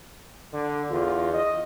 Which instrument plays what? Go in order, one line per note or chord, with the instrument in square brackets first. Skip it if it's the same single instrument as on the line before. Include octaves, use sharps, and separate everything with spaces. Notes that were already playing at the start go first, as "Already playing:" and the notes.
[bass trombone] D3
[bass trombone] E2 [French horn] F4
[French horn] D#5